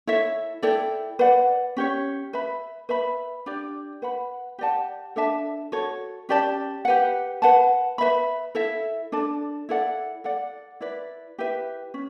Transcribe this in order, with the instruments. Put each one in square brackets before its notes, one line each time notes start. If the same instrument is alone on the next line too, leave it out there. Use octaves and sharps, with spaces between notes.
[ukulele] E4 A4 C#5 E5
E4 A4 D5 G5
B4 D5 F#5
C#4 G4 C#5
B4 E5 B5
B4 E5 B5
D4 G4 D5
B4 F#5 B5
G4 D5 F#5 A5
D4 A4 E5 A5
F#4 A4 C#5
C#4 G4 D5 A5
G4 B4 F#5
B4 F#5 A5
B4 E5 B5
E4 A4 E5
D4 A4 D5 A5
E4 A4 D5 F#5
A4 D5 F#5
E4 B4 D5
E4 G4 B4 E5
C#4